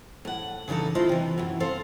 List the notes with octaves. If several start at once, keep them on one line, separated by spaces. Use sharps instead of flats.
A2 F#5
C#3 E3 D4 D#4 A4
D4 E4 F4 C5 D#5
C3 E3
F#2 A2 E3
C4 A4 C5 F5